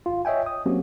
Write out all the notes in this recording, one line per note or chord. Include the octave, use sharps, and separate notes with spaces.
G#1 F4
C#5 D#5 E5 G5 G#5
D#6
F#3 A#3 C4 C#4 F#4 G4